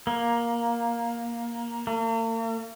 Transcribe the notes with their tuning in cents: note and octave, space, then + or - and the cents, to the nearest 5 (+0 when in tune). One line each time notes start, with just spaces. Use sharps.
A#3 +10
A#3 -45